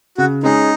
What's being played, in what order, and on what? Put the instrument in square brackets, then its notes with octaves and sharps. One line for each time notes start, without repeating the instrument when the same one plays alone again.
[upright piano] C#3 [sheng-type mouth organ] F#4
[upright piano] G#3 C#4 G#4 [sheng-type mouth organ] D#4